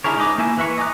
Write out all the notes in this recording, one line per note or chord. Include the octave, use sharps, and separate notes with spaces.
D4 E4 G#4 A#4 C#5
G#3 D#4 B4 D#5 D6
A#3 E4 E5 G#5
E3 B4 E5 C#6
D#5 G#5 A#5 D6 F#6